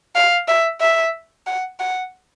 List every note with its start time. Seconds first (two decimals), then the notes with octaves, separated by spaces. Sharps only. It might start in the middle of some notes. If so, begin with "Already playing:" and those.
0.15 F5
0.48 E5
0.81 E5
1.47 F#5
1.80 F#5